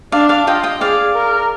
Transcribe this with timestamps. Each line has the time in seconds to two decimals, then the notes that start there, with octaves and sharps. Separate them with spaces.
0.12 D4 D5 F5
0.29 D5 F5
0.47 F4 D#5 G5
0.63 D#5 G5
0.81 G#4 D5 F5
1.15 A#4